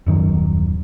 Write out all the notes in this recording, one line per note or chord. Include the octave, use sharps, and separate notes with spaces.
D#1 F#2 D#3 F#3